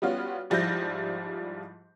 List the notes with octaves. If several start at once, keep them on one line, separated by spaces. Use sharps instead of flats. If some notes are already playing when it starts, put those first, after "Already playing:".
G3 B3 C#4 F4 F#4
G#2 F3 G3 E4 G6 A#6